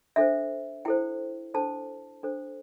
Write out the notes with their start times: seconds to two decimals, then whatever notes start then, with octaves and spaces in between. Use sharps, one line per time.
0.16 D4 A4 C5 E5
0.85 E4 A4 C5 G5
1.54 D4 A4 C5 A5
2.23 D4 A4 C5